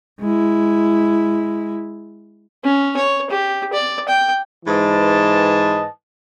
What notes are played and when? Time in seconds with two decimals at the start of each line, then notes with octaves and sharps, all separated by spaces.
0.20 G#3 E4
2.64 C#4
2.97 C#5
3.30 G4
3.73 D5
4.08 G5
4.66 G#2 E3 B4 D#5 A5